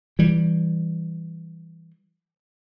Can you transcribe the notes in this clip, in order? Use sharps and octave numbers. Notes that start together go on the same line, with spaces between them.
E3 G3